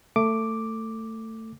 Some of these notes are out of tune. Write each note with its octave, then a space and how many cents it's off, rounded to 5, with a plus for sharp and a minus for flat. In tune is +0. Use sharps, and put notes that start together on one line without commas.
A3 +20 D6 +0